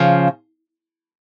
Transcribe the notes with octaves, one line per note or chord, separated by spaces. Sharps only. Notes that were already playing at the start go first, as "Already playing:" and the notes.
Already playing: C#3 F3